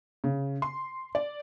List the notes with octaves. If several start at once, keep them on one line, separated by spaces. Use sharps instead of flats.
C#3
C6
D5